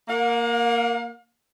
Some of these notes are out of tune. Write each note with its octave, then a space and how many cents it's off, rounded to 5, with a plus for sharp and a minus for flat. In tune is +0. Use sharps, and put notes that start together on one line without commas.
A#3 +0 F5 +45